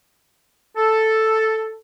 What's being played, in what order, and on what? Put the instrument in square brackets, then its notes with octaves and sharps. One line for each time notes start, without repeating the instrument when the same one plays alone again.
[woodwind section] A4